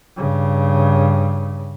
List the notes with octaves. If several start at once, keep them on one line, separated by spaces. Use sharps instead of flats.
G2 C#3